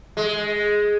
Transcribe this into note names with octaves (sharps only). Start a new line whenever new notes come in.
G#3